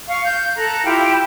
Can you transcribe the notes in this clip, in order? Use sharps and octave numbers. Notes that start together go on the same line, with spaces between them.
F5 C#6
G6
A4 A#5 F#6
E4 F4 G4 G5